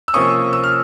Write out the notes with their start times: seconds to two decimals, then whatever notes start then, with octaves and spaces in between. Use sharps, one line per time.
0.08 E6
0.14 C3 F3 A#3 C#4 C#6 D#6
0.53 E6
0.64 F6